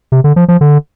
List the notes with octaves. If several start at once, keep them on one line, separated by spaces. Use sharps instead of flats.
C3
D3
F3
F3
D3